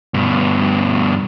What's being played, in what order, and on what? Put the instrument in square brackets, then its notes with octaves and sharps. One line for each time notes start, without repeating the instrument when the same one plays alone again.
[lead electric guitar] G2 B2